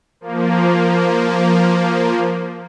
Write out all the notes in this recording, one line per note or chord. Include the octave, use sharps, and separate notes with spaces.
F3 A#3